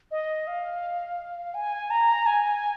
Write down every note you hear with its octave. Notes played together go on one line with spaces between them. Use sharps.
D#5
F5
G#5
A#5
G#5